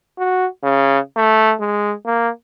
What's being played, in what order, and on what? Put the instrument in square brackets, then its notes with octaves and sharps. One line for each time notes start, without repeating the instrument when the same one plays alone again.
[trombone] F#4
C#3
A3
G#3
A#3